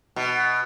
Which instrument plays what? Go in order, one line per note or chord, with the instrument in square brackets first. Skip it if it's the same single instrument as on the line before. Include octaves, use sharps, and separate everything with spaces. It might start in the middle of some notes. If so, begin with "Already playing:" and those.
[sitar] B2